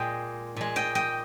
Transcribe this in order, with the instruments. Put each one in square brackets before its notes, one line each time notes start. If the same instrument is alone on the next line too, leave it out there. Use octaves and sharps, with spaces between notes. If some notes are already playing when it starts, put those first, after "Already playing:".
Already playing: [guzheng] A#2 G#3 D#5 G5
A#2 G#3
D#5 G5
D#5 G5